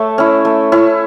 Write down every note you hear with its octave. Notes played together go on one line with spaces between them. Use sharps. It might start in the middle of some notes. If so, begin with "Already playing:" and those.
Already playing: A3 C#5 E5 A5
C#4 E4
A3
C#4 E4